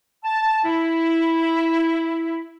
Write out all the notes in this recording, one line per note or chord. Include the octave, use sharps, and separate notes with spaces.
A5
E4